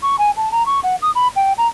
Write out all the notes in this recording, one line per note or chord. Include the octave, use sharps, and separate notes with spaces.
C#6
G#5
A5
A#5
C#6
F#5
D#6
B5
G5
A#5